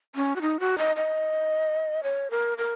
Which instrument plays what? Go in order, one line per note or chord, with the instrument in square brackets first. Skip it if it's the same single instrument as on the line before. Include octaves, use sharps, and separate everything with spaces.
[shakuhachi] C#4
F#4
D#4
F#4
D#5
D#5
C#5
A#4
A#4